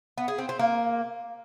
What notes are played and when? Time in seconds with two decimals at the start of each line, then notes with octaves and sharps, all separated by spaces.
0.18 B3
0.28 G#4
0.38 C4
0.49 C4
0.59 A#3